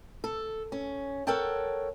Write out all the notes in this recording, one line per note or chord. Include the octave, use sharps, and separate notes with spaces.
A4
C#4
A4 A#4 C#5 F#5 G5 A5